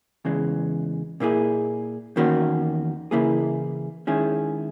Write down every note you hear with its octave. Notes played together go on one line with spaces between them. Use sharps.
E2 C#3 E3 G#3
A#2 A#3 E4 G#4
E2 D#3 A#3 C#4 F#4
C#3 E3 A#3 E4 G#4
D#3 G#3 C#4 E4 G#4